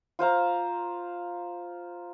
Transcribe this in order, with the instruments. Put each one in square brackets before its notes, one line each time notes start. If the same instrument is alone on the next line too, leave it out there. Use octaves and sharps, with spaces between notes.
[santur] F4 C5 F5 A#5